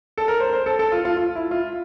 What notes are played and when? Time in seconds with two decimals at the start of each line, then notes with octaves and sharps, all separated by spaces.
0.18 A4
0.28 A#4
0.40 C5
0.53 C5
0.66 A4
0.79 A4
0.92 F4
1.05 F4
1.17 F4
1.35 E4
1.51 F4